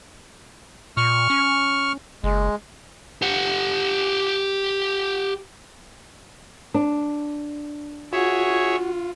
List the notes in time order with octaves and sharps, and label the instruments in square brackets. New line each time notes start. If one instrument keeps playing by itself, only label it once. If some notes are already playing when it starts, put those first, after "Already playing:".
[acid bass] A#2 [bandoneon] C#6 F6
[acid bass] C#4
[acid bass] F#1 [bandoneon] G#3
[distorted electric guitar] G4 F#5
[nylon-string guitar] D4
[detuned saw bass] F4 [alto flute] F#4 [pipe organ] G#4 C#5 E5